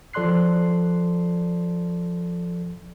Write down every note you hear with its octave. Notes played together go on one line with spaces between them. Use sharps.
F3 A4 D5 C6 F#6 C7